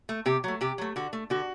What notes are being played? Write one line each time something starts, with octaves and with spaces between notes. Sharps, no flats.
A3
C3 G4
F#3 A3
C3 G4
F#3 A3
D3 F#4
A3
D3 F#4